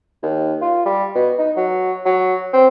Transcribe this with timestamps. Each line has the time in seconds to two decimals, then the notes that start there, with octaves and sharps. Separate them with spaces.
0.23 D#2
0.62 F4
0.86 G3
1.15 B2
1.39 D#4
1.57 F#3
2.05 F#3
2.53 C4